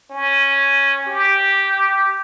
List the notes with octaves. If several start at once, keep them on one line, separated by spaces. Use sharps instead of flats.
C#4
G4